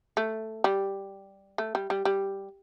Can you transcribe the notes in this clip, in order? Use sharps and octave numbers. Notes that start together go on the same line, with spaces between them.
A3
G3
A3
G3
G3
G3